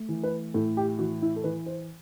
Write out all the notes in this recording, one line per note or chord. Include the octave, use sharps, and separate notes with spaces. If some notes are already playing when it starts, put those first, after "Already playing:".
Already playing: A3
E3
B4
A2 A4
G4
E3 F#4
E4
A4
E3 B4
C5